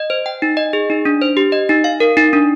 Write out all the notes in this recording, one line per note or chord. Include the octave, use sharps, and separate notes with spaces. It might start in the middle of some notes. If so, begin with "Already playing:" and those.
Already playing: D#5
C5
G5
D#4
D#5
G#4
D#4
D4
C5
G4
D#5
D#4
F5
A#4
D#4
D4